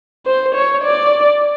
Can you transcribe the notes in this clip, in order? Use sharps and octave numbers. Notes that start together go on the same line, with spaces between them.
C5
C#5
D5